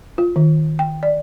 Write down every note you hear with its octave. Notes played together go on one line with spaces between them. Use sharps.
F4
D#3
G5
D5